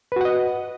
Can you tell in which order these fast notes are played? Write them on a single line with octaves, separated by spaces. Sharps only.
B4 F#4 F#5 D#5